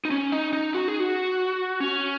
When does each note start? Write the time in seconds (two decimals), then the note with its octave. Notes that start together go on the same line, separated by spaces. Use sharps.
0.05 D#4
0.11 C#4
0.32 D#4
0.53 D#4
0.74 F#4
0.88 G#4
1.00 F#4
1.80 C#4